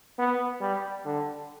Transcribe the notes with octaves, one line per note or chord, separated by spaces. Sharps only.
B3
G3
D3